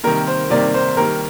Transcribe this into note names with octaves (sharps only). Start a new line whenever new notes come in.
C3 D#3 G3 A#3 A#4
C5
C3 D#3 G3 A#3 D5
C5
D#3 G3 A#3 A#4